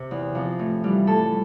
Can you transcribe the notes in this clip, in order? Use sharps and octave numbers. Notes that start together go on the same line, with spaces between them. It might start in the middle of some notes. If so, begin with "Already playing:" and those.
Already playing: C3 C5
E2
C3 F3
A2
E3 G3
A2 A4